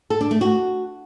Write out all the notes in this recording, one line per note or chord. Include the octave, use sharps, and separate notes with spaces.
A4
D4
A3
F#4